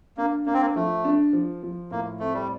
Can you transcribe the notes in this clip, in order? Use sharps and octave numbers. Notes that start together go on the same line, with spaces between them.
A#3 D4
A#3 D4
C4
A#3
F3 A3
D4
F3
F3
A2 A#3
A3 C4
G3